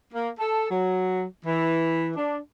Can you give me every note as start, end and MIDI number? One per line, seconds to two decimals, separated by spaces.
0.13 0.31 58
0.39 0.69 69
0.71 1.24 54
1.45 2.11 52
2.17 2.38 62